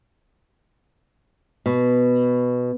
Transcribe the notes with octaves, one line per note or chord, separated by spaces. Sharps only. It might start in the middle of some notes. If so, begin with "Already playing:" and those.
B2